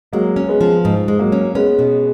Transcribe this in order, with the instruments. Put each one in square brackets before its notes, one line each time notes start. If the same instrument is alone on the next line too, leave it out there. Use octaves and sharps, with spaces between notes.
[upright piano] F#3 A#3 [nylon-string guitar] G#3
[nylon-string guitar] C#4
[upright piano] G#3 B3
[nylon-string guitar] F3
G#2
G#3
[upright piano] F#3 A#3
[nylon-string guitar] C#4
[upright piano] G#3 B3 [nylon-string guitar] C#4
[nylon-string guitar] B2